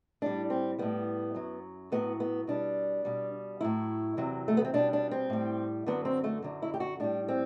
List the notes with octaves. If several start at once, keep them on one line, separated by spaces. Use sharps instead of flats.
A2 G3 D4
C4
A2 G3 B3
F#2 F#3
A2 F#3 B3
B3
B2 G3 D4
B2 G3
A2 F#3 E4
E2 C3 F#3
A3
B3
C4
B2 G3 D4
D4
C4
A2 G3
F#2 D3 F#3 B3
C4
A3
F#2 D3 F#3
E4
G4
F#4
A2 G3 D4
C4